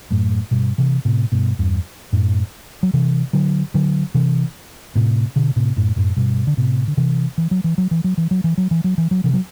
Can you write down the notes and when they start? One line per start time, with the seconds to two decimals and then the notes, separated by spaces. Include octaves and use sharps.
0.10 F#2 A2
0.51 G2 B2
0.78 C3 E3
1.05 A2 C3
1.32 G2 B2
1.59 E2 G2
2.13 F#2 A2
2.83 F#3
2.93 C3 E3
3.33 D3 F#3
3.74 D3 F#3
4.14 C3 E3
4.95 A2 C3
5.36 B2 D3
5.56 A2 C3
5.76 F#2 A2
5.96 F#2 A2
6.17 G2 B2
6.47 D3
6.57 A2 C3
6.88 D3
6.97 C3 E3
7.38 E3
7.51 F#3
7.64 E3
7.78 F#3
7.91 E3
8.04 F#3
8.17 E3
8.31 F#3
8.44 E3
8.58 F#3
8.71 E3
8.84 F#3
8.98 E3
9.11 F#3
9.24 C3 E3
9.33 F#3